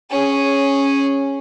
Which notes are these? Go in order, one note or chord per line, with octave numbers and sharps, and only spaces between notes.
C#4 G#4